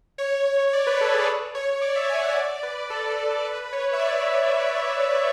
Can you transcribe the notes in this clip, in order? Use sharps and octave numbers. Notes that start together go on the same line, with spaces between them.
C#5
D5
B4
A4
G#4
C#5
D5
E5
G#5
F#5
D5
B4
A4
A4
B4
C#5
E5
D5